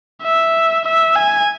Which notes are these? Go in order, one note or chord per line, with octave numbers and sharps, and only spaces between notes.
E5
E5
G#5